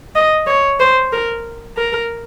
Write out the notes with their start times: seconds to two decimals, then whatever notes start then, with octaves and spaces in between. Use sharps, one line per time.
0.16 D#5
0.47 C#5
0.80 C5
1.13 A#4
1.77 A#4